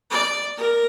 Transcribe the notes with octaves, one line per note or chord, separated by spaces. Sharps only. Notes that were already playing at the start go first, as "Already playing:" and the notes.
D5
A#4